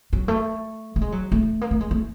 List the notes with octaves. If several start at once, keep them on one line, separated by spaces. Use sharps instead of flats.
F#3
A3
A3
G#3
F#3
A3
A#3
A3
G#3
A3